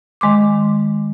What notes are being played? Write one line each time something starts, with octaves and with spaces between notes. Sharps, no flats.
D#3 G#3 C6 D6